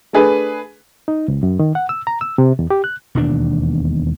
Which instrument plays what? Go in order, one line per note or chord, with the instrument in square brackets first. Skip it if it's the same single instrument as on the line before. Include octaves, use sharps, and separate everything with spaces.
[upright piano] A3 D4 G#4 B4
[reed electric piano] D#4
C#2
F#2
D#3
F#5
E6
A#5
E6
C3
E2
G4
F#6
[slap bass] E1 D#2 B2 D4